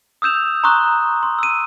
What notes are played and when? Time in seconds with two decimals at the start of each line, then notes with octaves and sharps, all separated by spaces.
0.22 D#6 E6 G6 E7 F7
0.64 A#5 C6 C#6 D#6 F#6 G7
1.23 C6
1.39 E6 D#7